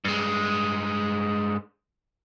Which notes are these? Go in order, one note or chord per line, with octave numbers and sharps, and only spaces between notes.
G2 G#3